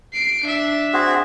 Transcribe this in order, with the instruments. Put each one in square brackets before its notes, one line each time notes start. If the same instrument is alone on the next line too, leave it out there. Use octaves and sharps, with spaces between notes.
[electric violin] C7 D7
D4 E5
[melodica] C4 F#4 G#4